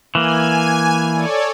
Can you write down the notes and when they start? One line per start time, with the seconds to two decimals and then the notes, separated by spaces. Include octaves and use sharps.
0.15 E3 A#3 G#5
1.13 A4 C#5 D5